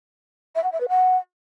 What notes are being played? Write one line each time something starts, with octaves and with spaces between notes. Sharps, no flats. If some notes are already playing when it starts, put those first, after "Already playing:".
E5
F#5
E5
B4
F#5